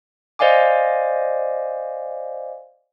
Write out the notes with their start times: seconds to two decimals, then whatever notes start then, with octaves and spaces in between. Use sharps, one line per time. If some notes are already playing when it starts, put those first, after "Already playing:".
0.39 C5 D5 D#5 F5 G#5 D6